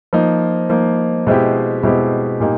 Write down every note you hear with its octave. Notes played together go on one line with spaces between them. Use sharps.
F3 A#3 D#4
F3 A#3 D#4
B2 G#3 C4 E4 G4
B2 G#3 C4 E4 G4
A#2 G3 A#3 D#4